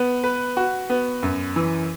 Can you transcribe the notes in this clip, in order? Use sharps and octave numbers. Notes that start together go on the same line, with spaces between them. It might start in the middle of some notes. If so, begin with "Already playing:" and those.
Already playing: B3
B4
F#4
B3
F#2
E3